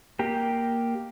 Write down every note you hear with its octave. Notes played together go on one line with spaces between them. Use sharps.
A#3 G4